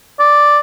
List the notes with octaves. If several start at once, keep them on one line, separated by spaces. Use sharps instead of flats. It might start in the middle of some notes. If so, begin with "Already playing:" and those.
D5